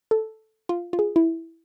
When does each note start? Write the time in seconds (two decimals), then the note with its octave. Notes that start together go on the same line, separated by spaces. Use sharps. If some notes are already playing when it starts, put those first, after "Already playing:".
0.11 A4
0.69 F4
0.93 F4
0.99 G#4
1.16 E4